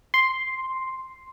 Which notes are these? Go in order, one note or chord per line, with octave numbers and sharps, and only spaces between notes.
C6